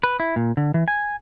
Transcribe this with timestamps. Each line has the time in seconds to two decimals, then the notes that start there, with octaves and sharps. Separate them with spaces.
0.03 B4
0.20 E4
0.36 A#2
0.57 D3
0.74 E3
0.88 G#5